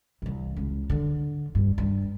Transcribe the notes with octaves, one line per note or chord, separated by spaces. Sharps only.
C2 E3
C#2
D3
G2
G2